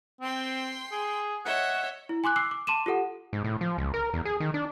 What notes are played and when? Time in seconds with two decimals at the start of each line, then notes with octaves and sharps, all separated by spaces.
0.21 C4 G5 C6
0.92 G#4
1.45 C#5 D#5 E5 F#5
2.09 E4
2.24 G#5 C6 D6 F#6
2.36 D6 E6 C7
2.51 D6
2.67 A5 C6 D6 D#7 E7
2.86 F4 G4 A4 F#5
3.33 G#2
3.44 A2
3.61 F3
3.78 C#2
3.94 A#4
4.14 E2
4.25 G#4
4.40 D#3
4.54 D4